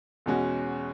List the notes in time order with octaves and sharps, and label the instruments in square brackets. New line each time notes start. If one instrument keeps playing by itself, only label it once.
[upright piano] E2 B2 G#3 C#4 F#4